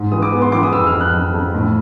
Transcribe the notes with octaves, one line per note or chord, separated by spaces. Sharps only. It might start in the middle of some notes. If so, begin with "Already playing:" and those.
Already playing: G#2
E3 D#6
D6
B3
C6
E3 D6
D#6
F2 E6
F6
F2
F#6
F2
F2
A2